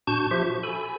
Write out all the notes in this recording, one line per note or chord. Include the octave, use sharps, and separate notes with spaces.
A#2 D4 F#4 A5 C#6 G6
F3 F4 G4 C5 E5 C#6
F#4
A4 G#5 B5